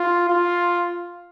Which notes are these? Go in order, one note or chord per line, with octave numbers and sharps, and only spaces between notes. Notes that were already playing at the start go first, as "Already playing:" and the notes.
Already playing: F4
F4